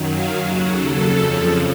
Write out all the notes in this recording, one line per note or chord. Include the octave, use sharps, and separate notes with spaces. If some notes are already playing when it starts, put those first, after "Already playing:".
Already playing: F#2 D#3 F#3
F5
D#2 C#3 F#3 F#4
A4
F2 C#3 F3